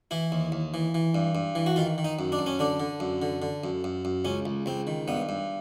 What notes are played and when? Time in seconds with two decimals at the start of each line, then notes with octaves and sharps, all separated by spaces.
0.11 E3 E4
0.32 D#2
0.52 D#2
0.74 E3
0.95 E3
1.15 G2
1.35 G2
1.55 E3
1.66 F#4
1.76 D#3 F4
1.98 D#3
2.05 D#4
2.19 F#2
2.32 D4
2.39 F#2
2.46 C#4
2.59 D3 D4
2.80 D3
3.00 F#2
3.22 D3
3.42 D3
3.64 F#2
3.84 F#2
4.05 F#2
4.25 C#2 C#4
4.46 C#2
4.66 C#2 C4
4.87 D#3
5.08 G2 B3
5.29 G2